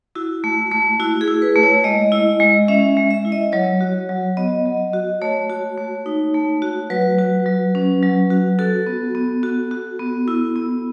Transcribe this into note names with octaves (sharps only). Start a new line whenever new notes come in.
E4 F#4
A3
A3
E4 F#4
G#4
E4
B4
A3
C#5
G#3 D#5
E4
G#3
C#4 E5
G#3
E5
E4
D#5
F#3 C#5
F#4
F#3
B3 D#5
F#3
F#4
A3 C#5
F#4
A3
D#4
A3
F#4
F#3 B4
F#4
F#3
C#4
F#3
F#4
F#4 A4
B3
B3
F#4
F#4
B3
E4
B3